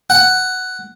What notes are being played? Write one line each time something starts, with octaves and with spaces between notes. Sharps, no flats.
F#5